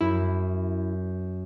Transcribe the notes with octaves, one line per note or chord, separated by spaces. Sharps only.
F#2 E4